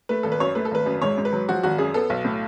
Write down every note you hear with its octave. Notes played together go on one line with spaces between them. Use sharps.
A3 B4
G#1 A4
B4
F#2 C#5
A3 B4
A4
G#1 B4
F#2
G#2 C#5
G#2
B4
F#3
F3 F#4
G#1 F#4
F#2 G#4
B3 A4
B1
A2